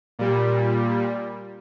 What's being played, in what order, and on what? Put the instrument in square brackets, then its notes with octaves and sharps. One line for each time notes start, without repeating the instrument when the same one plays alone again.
[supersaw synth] A#2 G3